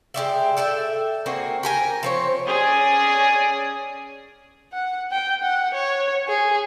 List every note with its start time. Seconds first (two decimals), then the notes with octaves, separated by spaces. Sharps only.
0.14 G#3 G4 D5 E5
0.57 A4 D5 E5 G5
1.26 A#3 C4 F#4 G#4
1.63 G4 A#4 G#5
2.03 F3 C4 C#5
2.48 C#4 G#4 D5 D#6
4.73 F#5
5.12 G5
5.43 F#5
5.74 C#5
6.28 G#4